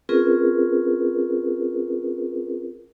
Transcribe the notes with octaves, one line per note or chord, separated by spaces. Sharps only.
C4 C#4 F4 G#4 A#4 B4